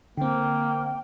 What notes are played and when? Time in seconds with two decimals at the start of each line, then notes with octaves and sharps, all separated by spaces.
0.18 D3 A#3 C4 G5